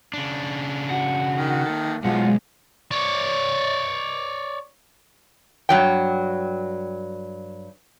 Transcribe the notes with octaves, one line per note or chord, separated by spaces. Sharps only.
C#3 D4
F#4
D#3
A#3 A4
B1 F3 G#3 F4 F#4
C#5 D5
G2 F#3 G5